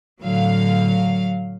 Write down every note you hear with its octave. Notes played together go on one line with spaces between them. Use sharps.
A2 D3 F#3 F5